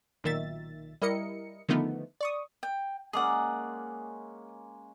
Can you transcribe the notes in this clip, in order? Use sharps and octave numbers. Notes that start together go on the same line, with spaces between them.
B1 A#2 D#3 E5 A6
G3 E4 A#4 D#5 C#7
D3 D#3 F3 A3 B3 D#4
D5 C#6 D#6
G5
G#3 A#3 C#4 G#4 D5 F#5